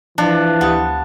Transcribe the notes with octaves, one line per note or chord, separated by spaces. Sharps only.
E3 F3 D4
D2 B3 G4 D#6